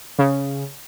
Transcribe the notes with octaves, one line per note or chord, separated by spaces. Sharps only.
C#3